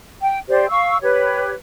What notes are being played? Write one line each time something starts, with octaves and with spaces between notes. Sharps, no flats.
G5
G4 C5 D5
F5 C#6 E6
G4 B4 C#5